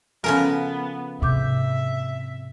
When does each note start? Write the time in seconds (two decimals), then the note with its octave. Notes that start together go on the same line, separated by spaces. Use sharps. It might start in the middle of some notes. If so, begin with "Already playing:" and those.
0.24 C#3 F3 B3 A4 A#4 G#5 F6
1.22 G#2 C3 E5 D6 G6